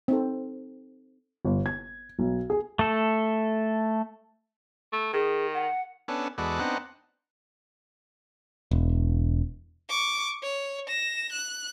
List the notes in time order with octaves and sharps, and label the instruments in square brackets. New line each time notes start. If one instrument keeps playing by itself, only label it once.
[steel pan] C4 D#4 A4
[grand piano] G1
G#6
B1
G#4
[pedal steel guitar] A3 A4
[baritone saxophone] A3
[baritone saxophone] D#3 [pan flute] G#4
[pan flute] F#5
[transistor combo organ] B3 C#4 D4 A4
E2 G#3 F#4 A4 B4 D5
B3 C4 D4 D#4 F#5
[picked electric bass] E1
[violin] C#6 D6
C#5
A#6 E7
F#6